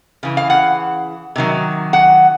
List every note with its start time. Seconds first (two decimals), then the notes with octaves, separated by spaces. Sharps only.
0.23 C#3 E3
0.37 F5
0.50 F#5
1.36 C3 D#3 F#3
1.93 F#5